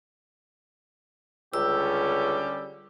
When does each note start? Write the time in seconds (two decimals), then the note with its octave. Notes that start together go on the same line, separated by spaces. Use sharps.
1.54 C#2 D3 G3 C#4 G4 E6